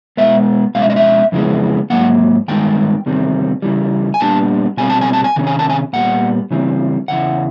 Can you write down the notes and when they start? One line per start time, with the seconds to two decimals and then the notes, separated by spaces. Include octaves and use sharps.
0.17 B2 G#3 B3 E5
0.75 B2 G#3 C#4 F5
0.82 E5
0.90 D#5
0.96 E5
1.32 F2 C#3 E3 G#3 B3
1.90 G#2 D#3 F#3 A#3 F#5
2.48 G2 D#3 G#3 B3 D#4 G5
3.06 E2 C3 D#3 G3 C4
3.62 C#3 E3 G3
4.14 G#5
4.20 A#2 G3 B3 D4 A5
4.77 B2 G3 C4 G#5
4.90 A5
5.01 G#5
5.13 A5
5.24 G#5
5.36 C3 D#3 C#4
5.47 G#5
5.59 A5
5.70 G#5
5.93 A#2 G3 B3 F#5
6.51 C#3 E3 G3 C4
7.08 E2 C#3 E3 F#5